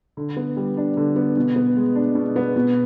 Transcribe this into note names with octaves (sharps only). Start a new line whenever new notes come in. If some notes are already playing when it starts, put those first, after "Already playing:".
D3
B3
G3
D4
D3
B3
B2
B3
G#3
D4
B2
B3
B2